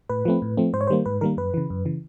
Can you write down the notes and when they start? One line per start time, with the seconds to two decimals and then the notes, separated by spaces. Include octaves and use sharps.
0.09 A2 B4
0.25 F3 A3 C4
0.42 A2
0.57 F3 A3 C4
0.73 G#2 C5
0.81 C#5
0.87 D#3 G3 A#3 C5
1.06 G#2 B4
1.21 D#3 G3 A#3 A#4
1.37 F#2 B4
1.54 C#3 E3
1.70 F#2
1.85 C#3 E3